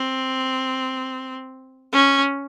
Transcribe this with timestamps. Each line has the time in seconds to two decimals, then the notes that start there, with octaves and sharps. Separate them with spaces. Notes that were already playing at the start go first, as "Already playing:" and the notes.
Already playing: C4
1.93 C#4